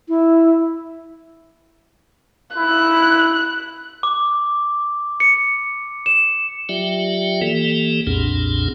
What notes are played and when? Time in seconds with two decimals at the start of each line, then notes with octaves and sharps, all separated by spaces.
0.09 E4
2.57 E4 F#6
4.03 D6
5.20 C#7
6.06 E7
6.69 F#3 F4 G4 D5 E5 G5
7.42 E3 A#3 G4 A4
8.07 B1 F2 A#2 C4 D4 G#4